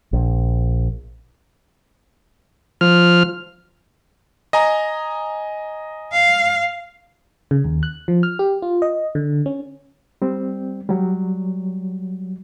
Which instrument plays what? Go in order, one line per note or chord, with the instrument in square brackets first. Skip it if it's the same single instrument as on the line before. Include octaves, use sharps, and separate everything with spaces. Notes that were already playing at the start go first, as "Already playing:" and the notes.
[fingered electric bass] A#1
[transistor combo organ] F3 F6
[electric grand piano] D#5 G#5 A#5
[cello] F5
[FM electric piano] C#3
D#2
F#6
F3
F6
G4
F4
D#5
D3
C#4
[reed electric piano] G3 C4
F#3 G3